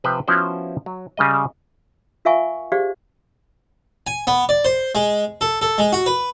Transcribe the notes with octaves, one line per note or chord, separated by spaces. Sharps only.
C3 F3 B4 C5 G5
F3 B3 C#4 E4 F#4 C5
F#3
C#3 G3 D#5
F4 A#4 E5 F5 G#5 C#6
G4 G#4 C5 D5 F5
G#5
B3
D5
C5
G#3
A4
A4
G#3
F#4
B4